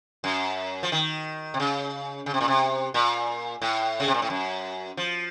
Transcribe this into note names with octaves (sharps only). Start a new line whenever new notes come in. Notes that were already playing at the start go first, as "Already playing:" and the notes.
F#2
F3
D#3
C3
C#3
C#3
C3
A#2
C3
A#2
A2
C#3
C3
A#2
A2
F#2
F3